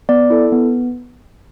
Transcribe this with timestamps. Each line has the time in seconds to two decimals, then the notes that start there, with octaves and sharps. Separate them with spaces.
0.09 B3 D5
0.30 E4 A4
0.52 B3